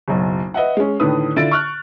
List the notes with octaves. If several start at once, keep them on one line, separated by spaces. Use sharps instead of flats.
F#1 B1
B4 D#5 E5 F#5
G#3 C#4
A2 D3 D#3 D4 B4 D#6
D3 E4 F4 A6 D7
C#6 F6 F#6